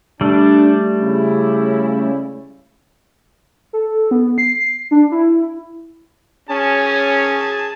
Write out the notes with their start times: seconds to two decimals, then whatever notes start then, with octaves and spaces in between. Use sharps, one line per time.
0.21 G3 A3 D4
1.00 C#3 C#4 E4
3.73 A4
4.11 B3
4.38 C7
4.91 D4
5.12 E4
6.50 C#4 G#4 A5